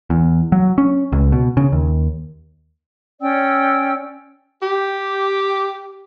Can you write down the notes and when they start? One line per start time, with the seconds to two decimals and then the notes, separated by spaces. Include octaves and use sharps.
0.10 E2
0.52 F#3
0.78 C#4
1.12 C#2
1.32 B2
1.57 C#3
1.72 D#2
3.21 C#4 D5 G5 E6
4.63 G4